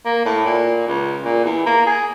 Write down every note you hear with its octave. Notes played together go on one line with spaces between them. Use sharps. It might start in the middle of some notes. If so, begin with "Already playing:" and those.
A#3
A2
A#2
C#2
A#2
E2
A#3
G#4